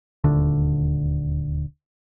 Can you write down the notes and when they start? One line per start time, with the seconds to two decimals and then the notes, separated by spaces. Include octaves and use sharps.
0.24 D#1 D2 D3